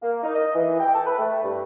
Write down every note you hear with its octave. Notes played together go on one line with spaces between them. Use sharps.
A#3
D#4
D#5
E3
G5
A4
B4
A3
G2